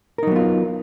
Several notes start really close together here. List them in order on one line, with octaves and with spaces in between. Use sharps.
A#4 D#4 F#3 B3 F4